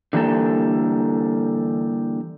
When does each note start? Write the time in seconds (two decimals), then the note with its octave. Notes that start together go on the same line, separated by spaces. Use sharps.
0.13 D3 E3 G3 A#3 A4